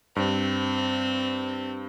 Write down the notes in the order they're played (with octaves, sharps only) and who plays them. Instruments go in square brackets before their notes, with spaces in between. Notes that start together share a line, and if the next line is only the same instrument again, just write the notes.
[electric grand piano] G2 [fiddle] C4